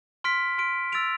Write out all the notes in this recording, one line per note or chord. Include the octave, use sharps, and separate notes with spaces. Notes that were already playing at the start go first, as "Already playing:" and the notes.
C6 F6 B6 D7
C6 F6 B6 D7
E6 A6 D7 F7